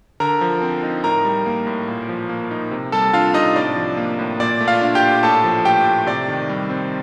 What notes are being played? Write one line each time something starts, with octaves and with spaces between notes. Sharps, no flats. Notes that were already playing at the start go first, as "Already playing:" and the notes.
D3 A#4 A#5
F3
C4
D#4
A2 A#4 A#5
G3
A#3
A2
A#2
F3
A#3
D#4
C3
G3 A4 A5
D4 F4 F5
C3 D#4 D#5
A2 D5
F3
A#3
A2
A#2 D5
A3
F4 F5
D4
G4 G5
A#2
A2 A4 A5
F3
A3 G4 G5
A2
C3 D5
D#3
G3
C4